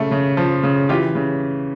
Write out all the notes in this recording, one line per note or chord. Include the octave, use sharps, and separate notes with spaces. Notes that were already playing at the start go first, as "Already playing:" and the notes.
Already playing: C#3 A3
C#3
F3
C#3
E3 F4 G4
C#3